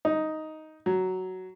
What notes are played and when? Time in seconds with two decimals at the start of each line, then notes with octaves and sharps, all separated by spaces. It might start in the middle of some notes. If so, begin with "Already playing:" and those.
0.05 D#4
0.86 F#3